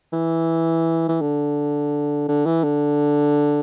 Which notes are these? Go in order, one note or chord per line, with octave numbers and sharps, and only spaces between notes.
E3
E3
D3
D3
E3
D3